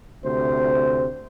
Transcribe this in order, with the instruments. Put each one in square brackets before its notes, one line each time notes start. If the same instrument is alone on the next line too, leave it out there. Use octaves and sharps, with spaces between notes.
[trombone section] D2 C3 C5